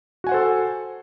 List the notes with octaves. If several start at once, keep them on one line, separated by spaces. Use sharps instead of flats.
F#4 A4 C5 F#5 G#5